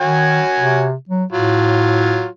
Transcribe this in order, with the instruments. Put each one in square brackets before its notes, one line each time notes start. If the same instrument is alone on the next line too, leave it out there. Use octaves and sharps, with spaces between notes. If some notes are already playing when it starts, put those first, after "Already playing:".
[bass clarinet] D#3 [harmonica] F#4 C#5 G#5
[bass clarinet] C3
F#3
[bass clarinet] A2 [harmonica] F#3 F4